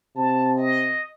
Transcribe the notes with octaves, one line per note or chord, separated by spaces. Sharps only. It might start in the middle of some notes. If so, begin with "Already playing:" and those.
C3 A5
D#5